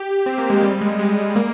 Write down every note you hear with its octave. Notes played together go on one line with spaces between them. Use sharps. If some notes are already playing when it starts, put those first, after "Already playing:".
Already playing: G4
C4
A#3
G#3
G3
G#3
G#3
A#3